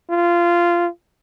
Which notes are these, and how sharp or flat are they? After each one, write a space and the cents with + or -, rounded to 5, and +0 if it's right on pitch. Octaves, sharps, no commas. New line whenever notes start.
F4 -15